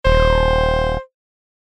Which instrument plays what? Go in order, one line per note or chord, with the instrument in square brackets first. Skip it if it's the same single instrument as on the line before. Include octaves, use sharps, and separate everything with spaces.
[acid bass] D#1 [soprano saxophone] C5